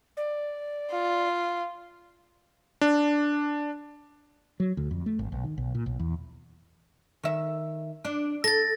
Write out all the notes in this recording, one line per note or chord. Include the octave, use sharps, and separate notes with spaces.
D5
F4
D4
F#3
D2
F2
A3
G#1
B1
D#3
B1
A#2
B1
E2
D#3 E5
D4
A4 A6 A#6